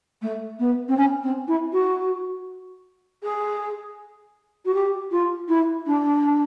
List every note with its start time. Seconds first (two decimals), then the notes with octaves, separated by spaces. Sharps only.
0.22 A3
0.59 B3
0.88 C4
0.97 C#4
1.23 C4
1.48 E4
1.73 F#4
3.23 G#4
4.65 F#4
4.74 G4
5.11 F4
5.48 E4
5.87 D4